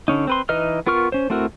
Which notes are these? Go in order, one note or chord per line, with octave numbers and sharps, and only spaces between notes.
D3 C#4 D#4
C4 B4 C6
E3 D#4 B4 D#5 F6
B3 F4 A#4 C#6 F6
C#4 C5
A3 C4 E4 F#4 A#4